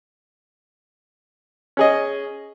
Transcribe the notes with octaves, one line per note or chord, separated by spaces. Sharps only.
C#4 G#4 D#5